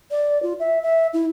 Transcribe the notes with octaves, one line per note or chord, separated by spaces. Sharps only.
D5
F4
E5
E5
E4